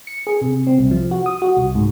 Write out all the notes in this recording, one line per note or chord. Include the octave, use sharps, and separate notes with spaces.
C#7
G#4
C3
C4
C2
F3
F#4
D#6
F#4
C2
G#2